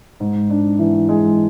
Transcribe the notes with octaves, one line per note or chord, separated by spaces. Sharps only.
G#2
D4
E3
G#3